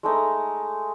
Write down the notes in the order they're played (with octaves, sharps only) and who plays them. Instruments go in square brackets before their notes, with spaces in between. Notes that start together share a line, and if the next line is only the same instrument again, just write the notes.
[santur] G#3 A3 D#4